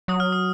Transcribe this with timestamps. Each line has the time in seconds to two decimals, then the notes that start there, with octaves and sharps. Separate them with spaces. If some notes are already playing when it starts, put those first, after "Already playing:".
0.08 F#3 D#6
0.20 F6
0.32 D#6